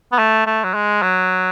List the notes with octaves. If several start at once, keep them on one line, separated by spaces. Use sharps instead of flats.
B3
A3
A3
F#3
G#3
F#3